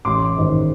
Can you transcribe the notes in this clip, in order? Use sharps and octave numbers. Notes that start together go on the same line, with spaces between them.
A1 C6 D6
G#2 D#3